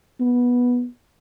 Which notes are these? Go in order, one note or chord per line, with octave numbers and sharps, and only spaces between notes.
B3